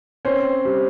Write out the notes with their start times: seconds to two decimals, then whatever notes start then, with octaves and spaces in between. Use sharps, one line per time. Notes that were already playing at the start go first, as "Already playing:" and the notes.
0.25 C4 C#4 C5
0.65 G3